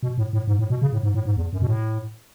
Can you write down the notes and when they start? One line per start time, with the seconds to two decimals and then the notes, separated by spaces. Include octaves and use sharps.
0.03 B2
0.18 A2
0.33 A2
0.47 G#2
0.59 A2
0.70 B2
0.82 C#3
0.93 A2
1.03 G#2
1.14 A2
1.26 G#2
1.37 E2
1.53 F#2
1.62 B2
1.67 A2